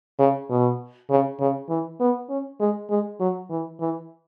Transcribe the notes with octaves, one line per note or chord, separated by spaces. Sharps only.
C#3
B2
C#3
C#3
E3
B3
C#4
G#3
G#3
F#3
E3
E3